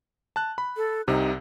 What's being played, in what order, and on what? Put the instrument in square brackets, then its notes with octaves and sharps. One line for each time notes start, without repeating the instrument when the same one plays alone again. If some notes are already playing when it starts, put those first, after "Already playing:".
[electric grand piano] A5 F#6
B5
[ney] A4
[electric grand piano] C2 C3 [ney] D#4